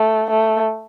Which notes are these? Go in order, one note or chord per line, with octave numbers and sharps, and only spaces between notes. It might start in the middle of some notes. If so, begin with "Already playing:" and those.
Already playing: A3
A3